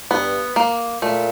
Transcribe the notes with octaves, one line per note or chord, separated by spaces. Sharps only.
G2 B3
A#3
A#2 A3